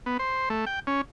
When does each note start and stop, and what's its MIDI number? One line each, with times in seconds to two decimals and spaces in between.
0.06 0.17 59
0.19 0.49 72
0.50 0.65 57
0.67 0.80 79
0.87 1.01 61